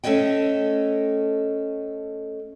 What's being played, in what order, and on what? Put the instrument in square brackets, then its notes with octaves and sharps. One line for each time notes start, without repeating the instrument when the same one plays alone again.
[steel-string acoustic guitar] A3 C#4 A4 D#5 G5